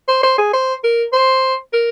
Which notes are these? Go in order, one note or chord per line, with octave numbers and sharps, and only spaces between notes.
C5
C5
G#4
C5
A#4
C5
A#4